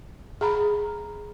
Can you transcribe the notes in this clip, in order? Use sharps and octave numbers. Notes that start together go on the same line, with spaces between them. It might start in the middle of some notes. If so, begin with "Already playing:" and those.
G#4 A#5 B5